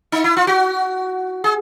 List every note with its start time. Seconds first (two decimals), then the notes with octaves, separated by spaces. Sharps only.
0.12 D#4
0.24 E4
0.37 F4
0.47 F#4
1.44 G#4